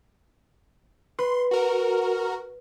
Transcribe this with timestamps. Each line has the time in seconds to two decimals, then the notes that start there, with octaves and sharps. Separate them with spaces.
1.19 B4 C6
1.51 F#4 A#4